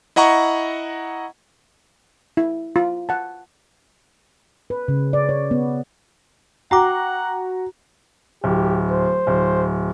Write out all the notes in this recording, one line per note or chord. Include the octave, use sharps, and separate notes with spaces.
E4 D#5 F#5 A#5 C#6
E4
F4
F#5 A5
B4
C#3
D5
C#5
B3
F#4 F#5 G5 A#5 D6
D1 G4
C5
D1